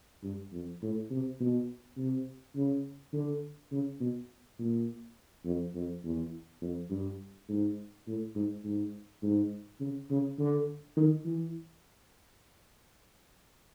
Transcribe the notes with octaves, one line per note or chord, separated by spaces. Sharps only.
G2
F2
A2
C3
B2
C3
C#3
D3
C#3
B2
A#2
F2
F2
E2
F2
G2
G#2
A2
G#2
G#2
G#2
C#3
C#3
D3
D#3
E3